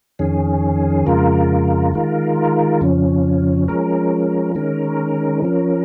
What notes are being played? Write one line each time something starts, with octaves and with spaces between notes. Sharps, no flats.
F2 D#3 C#4 G#4
F2 C#3 G#3 F4 A#4
D#3 G#3 F4 A#4
F2 C#3 F3 C#4
F3 G#3 C#4 A#4
D#3 G#3 C#4 A#4
F3 C#4 A#4